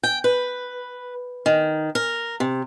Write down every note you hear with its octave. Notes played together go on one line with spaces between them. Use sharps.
G5
B4
D#3
A#4
C3